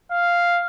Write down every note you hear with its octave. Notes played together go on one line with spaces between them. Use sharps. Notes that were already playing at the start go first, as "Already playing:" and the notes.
F5